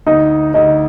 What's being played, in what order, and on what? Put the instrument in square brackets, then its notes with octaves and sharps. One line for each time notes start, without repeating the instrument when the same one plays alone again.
[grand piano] D2 [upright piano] D#4 D#5
[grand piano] D2 [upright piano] D#4 D#5